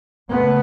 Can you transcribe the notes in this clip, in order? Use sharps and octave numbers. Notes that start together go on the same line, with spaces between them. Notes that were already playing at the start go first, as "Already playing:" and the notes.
C#3 A3 B3